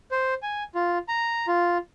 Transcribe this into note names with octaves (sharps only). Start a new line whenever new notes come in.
C5
G#5
F4
A#5
F4